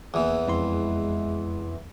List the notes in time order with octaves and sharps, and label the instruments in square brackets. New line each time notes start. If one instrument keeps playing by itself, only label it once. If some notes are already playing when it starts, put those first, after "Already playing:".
[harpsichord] E2 E3 [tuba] A#3
[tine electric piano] F2 E4 C6 [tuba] G#3